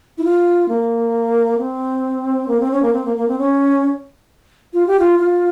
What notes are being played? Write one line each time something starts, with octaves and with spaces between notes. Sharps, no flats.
E4
F4
A#3
C4
A#3
C4
C#4
A#3
C4
A#3
A#3
C4
C#4
F4
G4
F4
F4